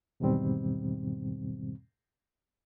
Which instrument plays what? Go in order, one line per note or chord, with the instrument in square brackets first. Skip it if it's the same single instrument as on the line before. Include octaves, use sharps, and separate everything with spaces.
[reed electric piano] E2 G#2 B2 D#3 G3 C4